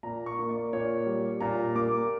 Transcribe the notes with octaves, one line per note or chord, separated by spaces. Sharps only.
A#2 A#5
C#6
A#3
D5
A#2 C#5
G3
A#2 A#5
A#3 D6